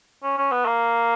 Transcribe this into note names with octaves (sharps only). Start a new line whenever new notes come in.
C#4
C#4
B3
A#3